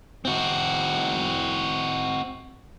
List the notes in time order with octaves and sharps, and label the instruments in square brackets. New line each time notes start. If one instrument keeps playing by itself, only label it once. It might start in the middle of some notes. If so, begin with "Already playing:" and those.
[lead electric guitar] C4 F#4